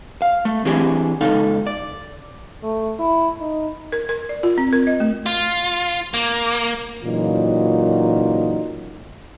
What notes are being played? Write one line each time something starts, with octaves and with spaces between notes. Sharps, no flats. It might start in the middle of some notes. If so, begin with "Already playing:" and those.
F5
A3
E3 C4 D4 G4 G#4
C#2 D#4 A4 F5
D5
A3
E4
D#4
A#4
A#4
D5
F4
C4
A#4
D#5
A3
F4
A#3
A#2 C#3 E3 F#3 D#4 F4